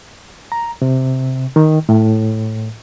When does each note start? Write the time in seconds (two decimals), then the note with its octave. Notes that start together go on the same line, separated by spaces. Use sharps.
0.52 A#5
0.82 C3
1.56 D#3
1.89 A2